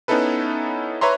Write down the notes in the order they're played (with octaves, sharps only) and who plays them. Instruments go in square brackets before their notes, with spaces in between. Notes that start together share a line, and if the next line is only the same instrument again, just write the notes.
[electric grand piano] B3 C#4 D#4 E4 A4 B4
B4 C#5 E5 A#5 C6